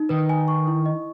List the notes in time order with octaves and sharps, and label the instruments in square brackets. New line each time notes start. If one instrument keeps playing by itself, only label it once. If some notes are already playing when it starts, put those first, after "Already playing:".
Already playing: [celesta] D#4
[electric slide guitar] D#3 [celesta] B4
[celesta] G#5
C#6
E4
D#5